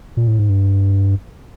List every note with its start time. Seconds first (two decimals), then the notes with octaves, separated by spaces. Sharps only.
0.17 A#2
0.28 A2
0.39 G#2
0.49 G2